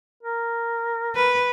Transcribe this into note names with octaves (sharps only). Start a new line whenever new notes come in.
A#4
B4